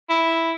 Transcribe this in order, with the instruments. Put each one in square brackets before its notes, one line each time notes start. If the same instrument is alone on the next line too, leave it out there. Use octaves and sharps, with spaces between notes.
[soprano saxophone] E4